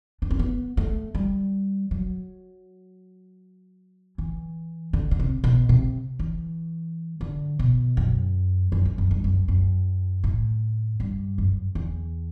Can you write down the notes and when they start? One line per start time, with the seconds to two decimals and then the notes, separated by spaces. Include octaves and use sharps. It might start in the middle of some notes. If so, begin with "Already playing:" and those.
0.22 D4
0.31 C4
0.39 B3
0.77 A3
1.15 G3
1.91 F#3
4.18 E3
4.93 D3
5.11 D3
5.19 C3
5.44 B2
5.69 C3
6.19 E3
7.21 D3
7.59 B2
7.97 F#2
8.72 F#2
8.85 G2
8.98 F#2
9.11 G2
9.24 F#2
9.48 F#2
10.24 A2
11.00 G2
11.38 F#2
11.75 E2